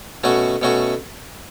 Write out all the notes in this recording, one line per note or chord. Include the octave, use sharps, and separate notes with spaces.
B2 A3 C#4 F#4
B2 A3 C#4 F#4